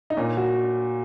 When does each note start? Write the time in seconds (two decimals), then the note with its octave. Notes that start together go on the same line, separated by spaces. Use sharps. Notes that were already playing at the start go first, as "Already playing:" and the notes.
0.10 D#4
0.17 A#2 C#4
0.37 F#4